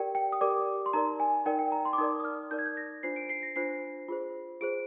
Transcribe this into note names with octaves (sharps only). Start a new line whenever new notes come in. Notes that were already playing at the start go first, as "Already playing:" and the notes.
Already playing: G4 A#4 D5 G5
G5
D#6
G4 A#4 D5 D6
C6
D#4 A#4 D5 A#5
G#5
D#4 A#4 D5 G5
G5
A#5
C6
D6
D#4 A#4 D5 D#6
D#6
F6
D#4 A#4 D5 G6
G#6
G6
A#6
D4 F4 C5 C7
D7
C7
A#6
D4 F4 C5 C7
F4 G#4 C5
F4 G#4 C5 D7